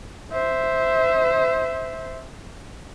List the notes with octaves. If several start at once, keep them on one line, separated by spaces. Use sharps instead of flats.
C5 E5